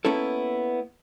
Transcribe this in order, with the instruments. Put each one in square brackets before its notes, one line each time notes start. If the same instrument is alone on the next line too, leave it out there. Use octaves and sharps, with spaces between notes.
[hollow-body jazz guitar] A#3 B3 C#4 E4 A4